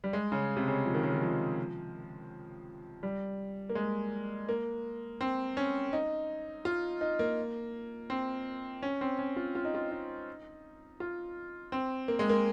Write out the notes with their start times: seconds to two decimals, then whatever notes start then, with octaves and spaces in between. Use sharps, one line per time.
0.04 G3
0.13 G#3
0.32 C#3
0.56 C3
0.68 C#3
0.86 F3
0.94 D#3
1.04 C#3
1.13 D#3
1.22 F3
3.03 G3
3.69 A#3
3.75 G#3
4.49 A#3
5.21 C4
5.57 C#4
5.93 D#4
6.65 F4
7.01 D#4
7.19 A#3
8.10 C4
8.83 C#4
9.01 C4
9.19 C#4
9.36 F4
9.55 F4
9.65 D#4
9.75 F4
9.91 D#4
11.00 F4
11.72 C4
12.08 A#3
12.19 G#3
12.29 A#3